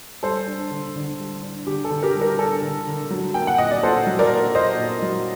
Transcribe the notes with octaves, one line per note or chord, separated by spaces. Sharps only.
G3 A4 C5
D4
D3
D3
G3
D4
D3 G4
A4
D3
G4 A#4
G3
G4 A#4
D4 A4
D3
D3
F#3
A#3 G5
F#5
A#2 D#5
D5
A#2 A4 C5
F#3
A#4 D5
A#3
A#2 C5 D#5
A#2
F#3